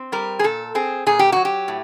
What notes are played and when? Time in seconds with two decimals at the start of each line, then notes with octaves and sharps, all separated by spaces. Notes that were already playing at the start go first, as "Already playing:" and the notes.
Already playing: C4
0.12 G3 A#4
0.39 G#4
0.44 A#2 A4
0.75 C4 G#4
1.06 A#2 G#4
1.19 G4
1.32 F#3 F#4
1.45 G4
1.68 A2